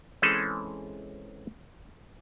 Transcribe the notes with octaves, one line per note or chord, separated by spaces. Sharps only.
E3 G#3 C4 C#4 G#4 A4